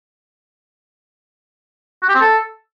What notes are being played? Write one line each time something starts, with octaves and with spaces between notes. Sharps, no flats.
F#4
G4
C4
A4